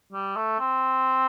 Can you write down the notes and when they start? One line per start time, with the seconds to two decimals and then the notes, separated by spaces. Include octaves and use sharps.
0.13 G3
0.36 A3
0.60 C4